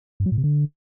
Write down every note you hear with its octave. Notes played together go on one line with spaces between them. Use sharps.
G2
F#3
A2
C3
D3